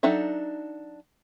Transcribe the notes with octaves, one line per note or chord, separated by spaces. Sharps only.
F#3 D4 D#4 A4 E5